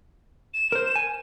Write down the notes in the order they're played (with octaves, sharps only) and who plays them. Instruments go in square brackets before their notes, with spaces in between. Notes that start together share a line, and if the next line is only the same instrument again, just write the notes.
[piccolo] E7
[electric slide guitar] A#4 C5
G#5